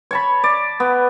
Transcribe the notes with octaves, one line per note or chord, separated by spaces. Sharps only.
C#5 A5 B5
D5
B3